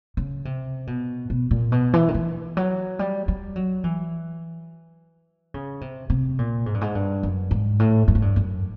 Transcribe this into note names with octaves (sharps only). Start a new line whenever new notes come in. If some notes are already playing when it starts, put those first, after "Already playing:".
C#3
C3
B2
B2
A#2
B2
E3
D#3
E3
F#3
G3
G3
F#3
E3
C#3
C3
C3
A#2
G#2
G2
G#2
G2
F#2
G#2
A2
G2
G#2
G2
F#2